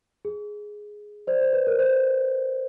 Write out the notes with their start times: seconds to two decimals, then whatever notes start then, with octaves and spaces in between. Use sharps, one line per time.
0.25 G#4
1.27 C5 D5
1.41 C5
1.53 B4
1.67 A#4
1.79 C5